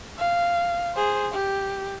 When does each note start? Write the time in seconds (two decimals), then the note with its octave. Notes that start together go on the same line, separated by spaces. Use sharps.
0.18 F5
0.95 G#4 C5
1.32 G4